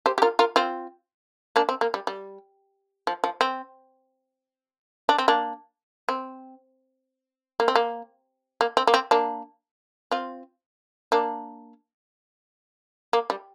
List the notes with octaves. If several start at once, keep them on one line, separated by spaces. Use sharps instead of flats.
G4 C5
G4
F4 A#4
F4 A#4
C4 F4
A#3 D4
C4
A#3
G3
G3
F3
F3
C4
D4
C4
A#3 D4
C4
A#3
C4
A#3
A#3
C4
A#3
C4
A#3 D4
C4 F4
A#3 D4
A#3
G3